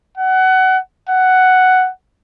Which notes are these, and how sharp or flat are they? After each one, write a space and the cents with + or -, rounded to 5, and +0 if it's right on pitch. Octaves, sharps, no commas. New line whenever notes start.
F#5 +25
F#5 +5